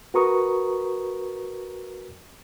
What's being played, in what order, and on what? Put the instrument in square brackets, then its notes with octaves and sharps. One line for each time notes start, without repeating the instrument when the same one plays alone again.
[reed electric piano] F#4 A#4 B4 A#5 C#6 D#6